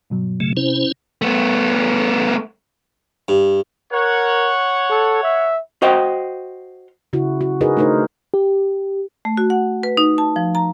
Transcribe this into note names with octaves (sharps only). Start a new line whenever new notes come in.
G2 B2 F#3
C#3 A3
C3 C#4 E4 C5
A3 B3
G2
A#4 C#5 F#5
A4
E5
F#4 C5 D#5 F5 G5
C#3 E4 F#4
F#4
D#4 F#4 G#4 A#4 B4 D#5
A3 D4 D#4 A#4 C5
G4
A3
F#4
F#5
B4
D#4
A5
F3
A#5